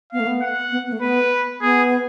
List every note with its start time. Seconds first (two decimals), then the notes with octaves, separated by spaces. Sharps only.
0.13 B3 F5
0.20 A3
0.27 B3
0.42 F#5
0.72 B3
0.87 B3
0.92 A3
1.02 B3 B4
1.61 B3 G#4